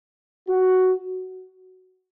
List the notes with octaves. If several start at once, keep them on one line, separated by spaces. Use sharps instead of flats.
F#4